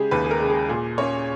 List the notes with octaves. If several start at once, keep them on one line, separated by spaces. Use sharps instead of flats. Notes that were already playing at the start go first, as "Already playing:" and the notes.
Already playing: C#3 G#3 G4 G#4
D#2 B4
G#4
A#4
C#3 G#3
G#4
A#2 G#4
A#3 C#4 C#5